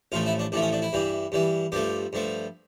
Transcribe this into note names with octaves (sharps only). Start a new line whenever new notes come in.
A1 A2 F3 A3 F4
E4
D4
A1 A2 F3 A3 D4
C#4
D4
E4
G2 E3 G3
G2 E3 G3
G2 F3 A3 G4
G2 F3 A3